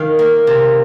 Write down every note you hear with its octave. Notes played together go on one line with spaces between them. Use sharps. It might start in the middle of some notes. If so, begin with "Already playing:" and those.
Already playing: D#3 F5
A#3
C3